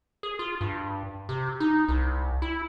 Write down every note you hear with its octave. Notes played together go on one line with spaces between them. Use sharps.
G#4
F4
G2
C3
D#4
C2
E4